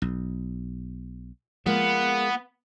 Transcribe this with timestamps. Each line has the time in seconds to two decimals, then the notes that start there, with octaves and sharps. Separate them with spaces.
0.02 B1
1.66 F3 G#3 A#3 B3